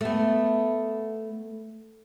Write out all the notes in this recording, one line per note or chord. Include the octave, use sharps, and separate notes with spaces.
A3 B3